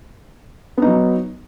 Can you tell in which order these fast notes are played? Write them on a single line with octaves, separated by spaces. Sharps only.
B3 D#4 F#3